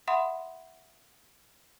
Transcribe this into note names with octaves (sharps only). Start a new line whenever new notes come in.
E5 F#5 B5 C6 D#6